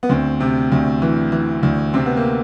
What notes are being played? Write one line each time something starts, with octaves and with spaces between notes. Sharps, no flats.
B3
D2 C4
C3
D2
E3
E3
D2
C3 C4
B3
A#3